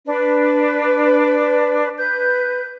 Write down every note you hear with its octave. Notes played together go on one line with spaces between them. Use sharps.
D4 B4
B4 G6